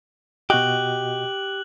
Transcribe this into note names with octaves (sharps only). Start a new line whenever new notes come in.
B2 F#4 G4 D#5 F#6 F#7